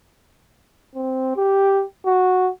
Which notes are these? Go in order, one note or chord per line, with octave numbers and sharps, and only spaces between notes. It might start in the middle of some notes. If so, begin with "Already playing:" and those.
C4
G4
F#4